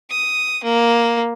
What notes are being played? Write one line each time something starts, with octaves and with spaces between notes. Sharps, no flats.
D#6
A#3